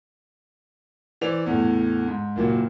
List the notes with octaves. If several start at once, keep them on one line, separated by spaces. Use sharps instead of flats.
E3 C5 D5 F7
E2 A2
G#2
F#1 A#2 F#3